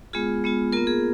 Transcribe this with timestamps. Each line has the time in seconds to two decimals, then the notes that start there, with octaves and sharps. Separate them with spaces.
0.13 G#3 B3 F4 G#4
0.44 G#3 B3 F4
0.72 A#3 B3 F4 A#4
0.87 G#4